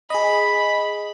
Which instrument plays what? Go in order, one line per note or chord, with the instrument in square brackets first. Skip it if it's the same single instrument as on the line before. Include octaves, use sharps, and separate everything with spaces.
[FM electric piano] G#4 D#5 [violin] B5